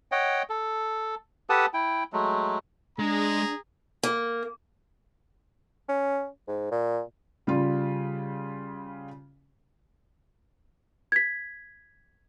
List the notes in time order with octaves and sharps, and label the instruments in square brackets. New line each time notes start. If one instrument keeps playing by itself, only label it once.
[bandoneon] C#5 D#5 F#5 G5
A4
G4 A4 B4 F#5 A5 D#6
E4 G5
F#3 G#3 A3
[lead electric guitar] G#3 [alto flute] D4 [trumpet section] G#4 A#5
[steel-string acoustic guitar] A#3
[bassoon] C#4
G#2
A#2
[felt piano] C#3 G3 F4
[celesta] G#6 B6